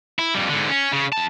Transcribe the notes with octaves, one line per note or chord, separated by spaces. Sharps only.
E4
F2 G3
G#2 D3
C#4
C#3
F2 A5